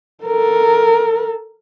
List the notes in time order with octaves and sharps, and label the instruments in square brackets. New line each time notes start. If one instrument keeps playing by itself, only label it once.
[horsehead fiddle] A4 A#4